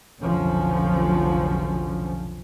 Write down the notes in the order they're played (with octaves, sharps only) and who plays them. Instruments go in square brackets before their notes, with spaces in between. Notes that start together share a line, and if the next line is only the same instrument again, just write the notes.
[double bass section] F1 B1 D3 F3 F#3 C#4